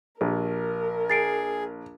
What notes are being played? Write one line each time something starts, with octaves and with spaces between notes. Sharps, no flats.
A#1 G4 A#4
G#4 A6 C7 D7